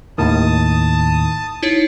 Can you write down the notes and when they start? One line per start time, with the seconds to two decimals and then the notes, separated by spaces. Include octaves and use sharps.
0.18 D#2 A2 D#3 A5 D#6
1.63 D#4 E4 C#5